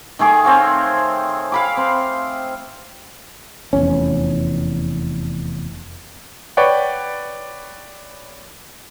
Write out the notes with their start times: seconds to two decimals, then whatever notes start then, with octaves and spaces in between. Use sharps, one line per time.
0.19 D#3 A3 G#4 D6
0.44 C4 C#5 F5
1.52 F5 B5 D6
1.77 C4
3.73 F1 E2 C#4
6.57 B4 C#5 D5 F#5 G5 C#6